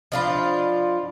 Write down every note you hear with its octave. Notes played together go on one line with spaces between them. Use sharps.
F3 D4 F4 D#5 F5 B5